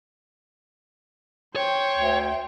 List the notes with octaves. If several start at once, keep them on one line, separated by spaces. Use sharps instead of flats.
C5 C#5 G5
D2